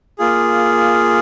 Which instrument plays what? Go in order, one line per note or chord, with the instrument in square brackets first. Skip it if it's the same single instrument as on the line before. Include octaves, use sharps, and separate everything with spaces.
[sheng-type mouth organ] A#3 F4 G#4